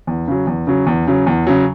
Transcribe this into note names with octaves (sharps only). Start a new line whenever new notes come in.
E2
C#3 F#3
E2
C#3 F#3
E2
C#3 F#3
E2
C#3 F#3